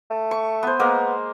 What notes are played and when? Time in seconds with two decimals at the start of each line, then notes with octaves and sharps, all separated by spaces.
0.11 A3
0.31 C#6
0.63 B3 C5
0.79 G#3 A#3 B3 A#4